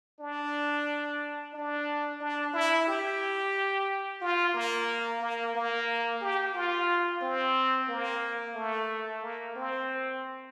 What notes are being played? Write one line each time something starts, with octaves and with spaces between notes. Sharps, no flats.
D4
D4
D4
E4
G4
F4
A#3
A#3
A#3
G4
F4
C4
A#3
A3
A#3
C4